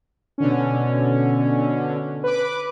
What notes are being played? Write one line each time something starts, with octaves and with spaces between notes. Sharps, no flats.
B2 D3 C#4
B4 D6